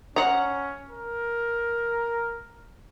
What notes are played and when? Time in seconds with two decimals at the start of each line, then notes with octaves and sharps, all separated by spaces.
0.16 C#4 F#5 A#5
0.91 A#4